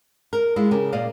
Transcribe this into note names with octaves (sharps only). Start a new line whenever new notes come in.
A#4
G#3 E4 F4
C#3 G4 A#4
A#2 D5 D#5 F5